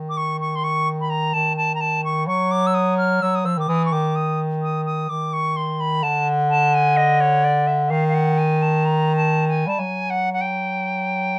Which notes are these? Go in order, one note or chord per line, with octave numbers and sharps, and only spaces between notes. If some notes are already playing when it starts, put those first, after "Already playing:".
Already playing: D#3
D6
C#6
C#6
C6
C#6
B5
A#5
D#3 A5
A5
A#5
A5
C#6
F#3 C#6
D6
E6
D#6
F6
F#3 E6
D#6
F3 E6
D#3 D6
E3 D#6
C#6
D#3 D6
D#6
D#6
D#6
D#3 D6
C#6
C6
B5
D3 A5
A5
G#5
D#5
C#5
D5
E5
E5
D#3 F5
F5
F#5
G#5
A5
A#5
A5
G#5
G3 A5
F#3 G#5
F#5
F#5
G5